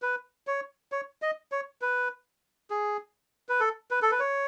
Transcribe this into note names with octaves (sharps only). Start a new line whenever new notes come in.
B4
C#5
C#5
D#5
C#5
B4
G#4
B4
A4
B4
A4
B4
C#5